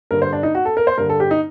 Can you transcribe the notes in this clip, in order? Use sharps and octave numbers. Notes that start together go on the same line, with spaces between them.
G2 D3 A#4
C5
D4
D#4
F#4
A4
A#4
C5
G2 D3 A#4
A4
G4
D#4